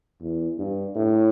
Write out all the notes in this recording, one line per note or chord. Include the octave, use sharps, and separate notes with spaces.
E2
G2
A2